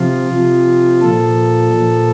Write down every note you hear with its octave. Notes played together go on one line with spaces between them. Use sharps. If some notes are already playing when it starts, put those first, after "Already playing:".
Already playing: C3 F3 F4
C3 F3
A#2 F3 A4
A#2 F3